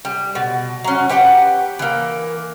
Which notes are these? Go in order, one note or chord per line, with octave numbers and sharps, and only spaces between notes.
G3
B2
F#3 C#4
G4 B4 F#5 G5
E3 A#3